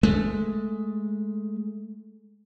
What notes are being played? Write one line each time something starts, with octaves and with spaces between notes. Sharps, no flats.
G#3 A3